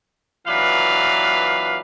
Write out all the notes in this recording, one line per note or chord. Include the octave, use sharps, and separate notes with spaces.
A#2 E3 F#3 D4 B4 F5